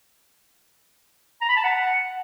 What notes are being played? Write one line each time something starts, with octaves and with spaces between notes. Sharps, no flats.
A#5
B5
A5
F#5